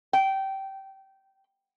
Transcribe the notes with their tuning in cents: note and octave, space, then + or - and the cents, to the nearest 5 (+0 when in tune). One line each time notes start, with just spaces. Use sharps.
G5 -20